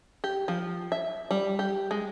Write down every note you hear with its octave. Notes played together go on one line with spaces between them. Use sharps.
G4
F3
E5
G3
G4
G#3